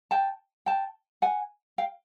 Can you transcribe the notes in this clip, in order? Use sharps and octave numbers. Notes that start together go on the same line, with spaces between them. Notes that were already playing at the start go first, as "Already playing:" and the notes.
G5 A5
G5 A5
F#5 G#5
F5 G5